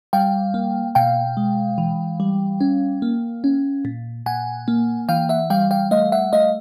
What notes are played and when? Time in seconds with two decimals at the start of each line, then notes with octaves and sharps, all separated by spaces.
0.13 G3 F5 G5
0.54 A#3
0.95 B2 F5 G5
1.37 G#3
1.78 E3
2.20 G3
2.61 C#4
3.02 A#3
3.44 C#4
3.85 A#2
4.26 A#2 F#5 G#5
4.68 A#3
5.09 E3 F5 G5
5.29 E5 F#5
5.50 G3 F5 G5
5.71 F5 G5
5.91 A3 D#5 F5
6.12 E5 F#5
6.33 A3 D#5 F5